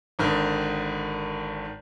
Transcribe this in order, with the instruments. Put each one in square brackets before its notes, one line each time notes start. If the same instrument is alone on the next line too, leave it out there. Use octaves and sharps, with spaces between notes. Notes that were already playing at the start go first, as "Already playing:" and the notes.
[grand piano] G#1 D3 D#3